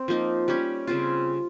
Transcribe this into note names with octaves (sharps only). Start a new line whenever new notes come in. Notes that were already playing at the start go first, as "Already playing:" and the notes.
Already playing: C4
F3 A#3 D#4
G3 C#4 G4 C#5
C#3 G3 C4 F4